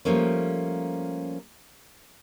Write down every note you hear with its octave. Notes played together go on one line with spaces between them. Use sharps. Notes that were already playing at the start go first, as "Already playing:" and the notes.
F3 G3 A3 A#3 C#4